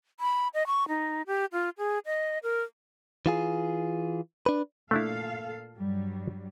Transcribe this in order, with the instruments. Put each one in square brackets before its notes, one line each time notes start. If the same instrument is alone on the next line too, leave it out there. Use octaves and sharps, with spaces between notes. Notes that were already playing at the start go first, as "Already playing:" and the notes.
[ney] B5
D#5
C#6
D#4
G4
F4
G#4
D#5
A#4
[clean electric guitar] E3 F4 G#4
D4 B4
[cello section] A#2 A4 F5 [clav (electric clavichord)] A3 D4 E4
[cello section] G2 F#3 G3